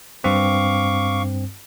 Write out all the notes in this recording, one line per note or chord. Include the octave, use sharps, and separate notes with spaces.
G2 C4 F5 C#6 D6